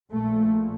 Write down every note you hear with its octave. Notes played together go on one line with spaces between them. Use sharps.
A#1 A#2 A3